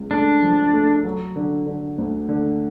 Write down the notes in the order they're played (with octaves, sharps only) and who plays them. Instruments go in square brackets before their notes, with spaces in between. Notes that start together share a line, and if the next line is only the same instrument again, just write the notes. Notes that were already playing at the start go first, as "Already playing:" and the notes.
Already playing: [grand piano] C#2 C#3
[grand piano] A3 [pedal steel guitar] D4
[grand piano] F3
A3
F#3
D3
D3
D2
D3